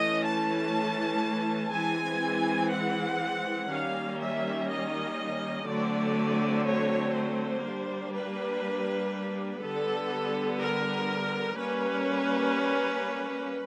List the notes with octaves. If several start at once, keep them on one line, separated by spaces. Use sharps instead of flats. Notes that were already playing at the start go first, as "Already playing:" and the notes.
Already playing: E3 A3 C#4 D#5
A5
E3 G#3 C4 G#5
F#5
D#3 G3 A#3 C#4 F5
E5
D#5
D3 F#3 A3 C4 D5
C#5
C5
G3 A#3 D4
B4
D3 G3 B3 A4
A#4
G3 A#3 C#4 B4